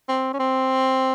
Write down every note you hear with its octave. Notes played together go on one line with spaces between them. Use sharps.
C4
C#4
C4